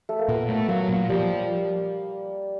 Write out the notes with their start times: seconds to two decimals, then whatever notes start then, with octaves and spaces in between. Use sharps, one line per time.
0.09 A3
0.19 A#3
0.29 A#2 B3
0.49 A3
0.69 F#3 A#3
0.89 A#2
1.09 F3 G3